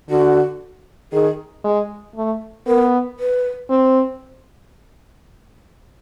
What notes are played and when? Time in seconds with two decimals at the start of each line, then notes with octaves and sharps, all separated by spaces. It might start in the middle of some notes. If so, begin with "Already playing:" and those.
0.10 D3 F#4
1.13 D#3 G#4
1.64 G#3
2.16 A3
2.67 B3 A#4
3.19 B4
3.70 C4